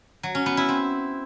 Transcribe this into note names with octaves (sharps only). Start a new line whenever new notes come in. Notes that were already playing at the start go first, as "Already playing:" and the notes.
F#3
C#4
B3
E4
C4